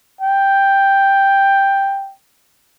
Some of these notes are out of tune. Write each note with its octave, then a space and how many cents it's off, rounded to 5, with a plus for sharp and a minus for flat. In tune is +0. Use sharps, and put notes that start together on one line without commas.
G5 +5